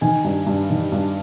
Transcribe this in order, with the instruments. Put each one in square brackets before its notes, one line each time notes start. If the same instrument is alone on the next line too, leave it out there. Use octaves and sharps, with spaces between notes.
[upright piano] D#3 G#5
G2
G2
D#3
G2